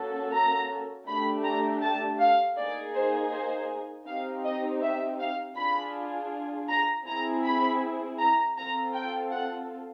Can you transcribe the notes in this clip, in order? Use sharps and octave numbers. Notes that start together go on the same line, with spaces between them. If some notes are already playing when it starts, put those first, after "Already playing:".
Already playing: A#3 C#4 F#4 A4
A#5
A3 D4 G4 B5
A#5
A5
F5
A#3 D#4 G#4 D5
C5
C5
C4 D#4 G4 F5
D#5
E5
F5
D4 F4 G#4 B5
A#5
C4 E4 G#4 A#5
B5
A#5
C4 F4 A4 A#5
G5
F#5